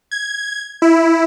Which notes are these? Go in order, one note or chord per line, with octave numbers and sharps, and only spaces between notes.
G#6
E4